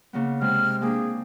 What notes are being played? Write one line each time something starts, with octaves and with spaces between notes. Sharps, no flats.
C#3 A#3 B3
C3 G#3 C4 F6
A#3 C4 D4 G#4